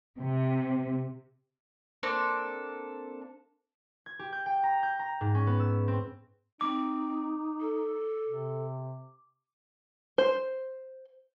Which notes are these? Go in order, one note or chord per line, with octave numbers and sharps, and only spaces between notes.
C3
A#3 C4 D4 A4
G#6
G4
G6
G5
A#5
G6
A#5
G#2
C#4
B3
E6
C4
C4 D#4 D6
A4
C3
C5